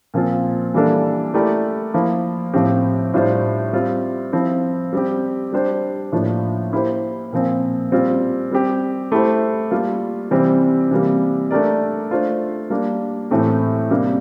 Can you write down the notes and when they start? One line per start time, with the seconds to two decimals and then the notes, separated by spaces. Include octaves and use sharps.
0.14 A#2 F3 C4 F4
0.74 E3 G3 A#3 D4 A4
1.34 A3 E4 G4 A#4 D5
1.94 F3 A#3 E4
2.54 A2 F3 C4 G4
3.14 A2 G3 D4 F4 C5
3.73 G3 C4 F4
4.33 F3 C4 E4
4.93 G3 C4 G4
5.53 G3 D4 G4 C5
6.12 A2 F3 A#3 D4 F4
6.72 A#3 E4 G4 C5
7.33 A#2 F3 C4
7.92 G3 C4 F4
8.51 G3 C4 G4
9.12 A3 E4 G4 C5
9.71 G3 A#3 F4
10.31 C3 E3 G3 C4 G4
10.91 C3 E3 G3 A#3
11.51 A3 D4 G4 A#4 D5
12.11 A3 D4 F4 C5
12.70 G3 A#3 D4
13.31 A2 E3 A3 C4 G4
13.90 C3 G3 A#3 D4 G4